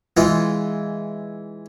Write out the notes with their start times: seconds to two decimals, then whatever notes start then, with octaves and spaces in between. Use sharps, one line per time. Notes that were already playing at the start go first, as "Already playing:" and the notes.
0.17 E3 G#3 F4